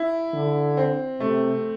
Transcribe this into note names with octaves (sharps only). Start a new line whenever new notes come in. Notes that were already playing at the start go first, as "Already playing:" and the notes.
Already playing: E4
D3
C4
C3 A3